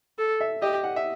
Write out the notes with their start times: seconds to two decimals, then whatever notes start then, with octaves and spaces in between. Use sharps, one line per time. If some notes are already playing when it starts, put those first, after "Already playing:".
0.18 A4
0.41 E5
0.61 G4 D#5
0.84 F#5
0.96 E5